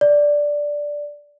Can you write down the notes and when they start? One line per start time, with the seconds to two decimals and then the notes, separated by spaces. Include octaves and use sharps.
0.01 D5